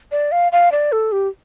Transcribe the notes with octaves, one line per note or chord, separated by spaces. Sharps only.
D5
F5
F5
D5
A4
G4